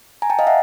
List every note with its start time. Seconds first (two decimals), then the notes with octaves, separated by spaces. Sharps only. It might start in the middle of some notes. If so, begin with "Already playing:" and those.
0.22 G#5 A#5
0.30 G5 A5
0.39 D#5 F5
0.47 E5 F#5